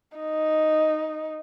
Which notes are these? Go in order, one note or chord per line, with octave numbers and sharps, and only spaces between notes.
D#4